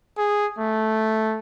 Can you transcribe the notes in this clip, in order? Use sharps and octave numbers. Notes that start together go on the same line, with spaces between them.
G#4
A3